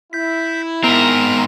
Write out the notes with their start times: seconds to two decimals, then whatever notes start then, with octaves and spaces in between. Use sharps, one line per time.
0.13 E4 G6 B6
0.84 G#2 B3 C4 A#4